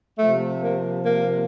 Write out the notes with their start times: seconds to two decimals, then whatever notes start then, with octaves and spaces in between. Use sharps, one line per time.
0.19 C3 F3 A3
0.63 A#3
1.05 A#3